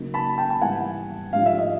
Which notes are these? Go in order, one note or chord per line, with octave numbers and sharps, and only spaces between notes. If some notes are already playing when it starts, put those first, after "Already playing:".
Already playing: C#3 F#3 A#3 D#4
A5 B5
G5 A5
A5
G#2 E3 G3 B3 E4 F#5 G#5
G#2 F3 A3 D4 G4 F5
E5
D#5